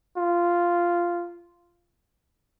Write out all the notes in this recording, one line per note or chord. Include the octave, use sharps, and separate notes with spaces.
F4